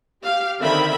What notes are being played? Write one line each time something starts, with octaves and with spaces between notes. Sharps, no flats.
G4 F5
D3 D#3 C4 A#4 E5 B5